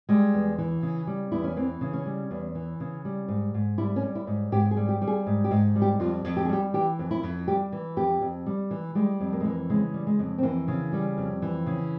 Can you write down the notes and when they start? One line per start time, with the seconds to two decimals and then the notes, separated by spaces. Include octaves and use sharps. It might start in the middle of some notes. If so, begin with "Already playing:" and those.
0.09 G3 G#3
0.34 E2
0.58 E3
0.82 C#3
1.07 G3
1.32 E2 E4
1.44 C#4
1.57 E3 C4
1.81 C#3
1.93 C#4
2.06 G3
2.31 E2
2.55 E3
2.80 C#3
3.05 G3
3.28 G#2
3.54 G#2
3.78 G3 E4
3.96 C#4
4.02 G3
4.15 E4
4.27 G#2
4.52 G#2 G4
4.71 G#4
4.77 G3
4.89 G4
5.02 G3
5.07 G#4
5.26 G#2
5.44 G4
5.51 G#2
5.76 G3
5.82 G4
6.00 F2 F4
6.24 F2
6.37 G4
6.45 G#4
6.49 G3 G4
6.74 E3 G4
6.99 F2
7.11 E4
7.23 F2
7.48 G3 G4
7.72 E3
7.97 F2 G4
8.21 F2
8.46 G3
8.71 E3
8.95 G3 G#3
9.20 F2
9.33 A#3
9.40 G#3
9.45 E3 A#3
9.70 C#3 G#3
9.94 G3
10.07 G#3
10.19 F2
10.38 C4
10.43 E3 A#3
10.68 C#3
10.93 G3
11.18 F2
11.42 E3
11.66 C#3